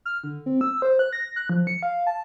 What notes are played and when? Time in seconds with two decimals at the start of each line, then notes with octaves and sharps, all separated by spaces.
0.05 F6
0.24 D3
0.46 C4
0.61 E6
0.82 C5
0.99 F#6
1.13 A#6
1.36 F#6
1.50 F3
1.67 C#7
1.83 F5
2.07 A5